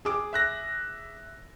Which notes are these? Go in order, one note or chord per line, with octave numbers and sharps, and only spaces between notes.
G#4 D6
E5 F#6 A#6